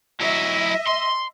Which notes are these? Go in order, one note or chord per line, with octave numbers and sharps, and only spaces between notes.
F#3 E4 D#5 E5
C6